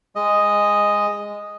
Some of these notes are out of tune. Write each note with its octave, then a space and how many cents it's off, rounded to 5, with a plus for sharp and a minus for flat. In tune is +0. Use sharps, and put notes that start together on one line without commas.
G#3 -15 D#5 +0